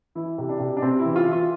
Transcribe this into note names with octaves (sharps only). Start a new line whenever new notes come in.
E3 E4
C3
D4
C3
D4
C3 C4
E4
E3
F4
E3
F4